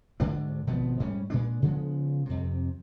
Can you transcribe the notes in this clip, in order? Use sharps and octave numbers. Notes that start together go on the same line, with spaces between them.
D2 G#2 D3 D4
G#1 B2 F3 B3
G#2 G3 C#4
A#2 G#3 D4
C#3 F3 G#3 B3
F2 C3